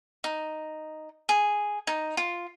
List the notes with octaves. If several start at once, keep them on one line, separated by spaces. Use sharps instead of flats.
D#4
G#4
D#4
F4